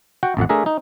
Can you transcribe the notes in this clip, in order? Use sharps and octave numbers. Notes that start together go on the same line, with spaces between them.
F#4 F#5 G5
A1 F2 F#5
A3 D4 G#4 A#4 E5
D#4